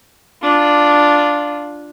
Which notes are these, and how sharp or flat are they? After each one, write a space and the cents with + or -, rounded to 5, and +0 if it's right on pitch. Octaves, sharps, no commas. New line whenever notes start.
D4 +0 F4 +0